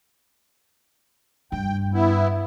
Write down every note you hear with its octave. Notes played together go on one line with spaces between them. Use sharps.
G2 G5
B3 E4